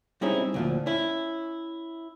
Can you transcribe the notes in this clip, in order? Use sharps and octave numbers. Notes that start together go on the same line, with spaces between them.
G3 C4 C#4 D#4 E4 G#4
D2 A#2 F3
C#4 E4